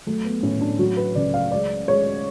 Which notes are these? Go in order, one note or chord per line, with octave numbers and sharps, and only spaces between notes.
F#3 A3
B3
A2 C#4
D4
F#3 F#4
B4
C#2 D5
F5
G#3 D5
G#3 C#5